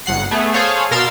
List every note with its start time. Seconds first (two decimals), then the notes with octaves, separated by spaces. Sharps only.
0.06 G1 F#5 C7
0.31 A3 B3 G#4
0.54 G#4 A4 C5 C#5 F5
0.91 B2 A#4 F5 C6 E6 A6